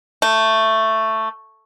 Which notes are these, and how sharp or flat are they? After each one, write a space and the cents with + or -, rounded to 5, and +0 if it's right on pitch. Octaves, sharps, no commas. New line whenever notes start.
A3 +10